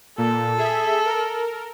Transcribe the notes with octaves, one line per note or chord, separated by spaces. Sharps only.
A#2 A4
G#4 E5
A#4